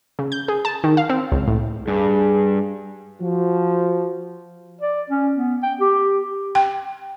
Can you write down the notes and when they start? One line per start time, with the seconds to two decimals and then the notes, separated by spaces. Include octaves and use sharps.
0.19 C#3
0.32 G6
0.48 G#4
0.65 A5
0.84 D#3
0.97 F5
1.09 C4
1.32 C#2
1.47 A2
1.88 G2 G#4
3.20 F3 F#4
4.81 D5
5.10 C#4
5.36 B3
5.63 G5
5.81 G4
6.55 G5